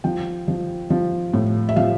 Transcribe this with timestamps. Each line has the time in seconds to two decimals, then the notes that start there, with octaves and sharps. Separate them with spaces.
0.04 F3 G5
0.48 F3
0.90 F3
1.33 A2
1.69 E5
1.76 F3 F5